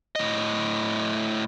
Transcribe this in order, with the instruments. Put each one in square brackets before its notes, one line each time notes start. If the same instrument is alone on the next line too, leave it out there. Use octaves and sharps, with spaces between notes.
[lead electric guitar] A2 D#5